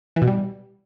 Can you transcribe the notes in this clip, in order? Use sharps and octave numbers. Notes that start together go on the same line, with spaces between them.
E3
B2
G3